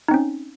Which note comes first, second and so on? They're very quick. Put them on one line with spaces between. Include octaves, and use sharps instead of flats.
D#4 C4 C#4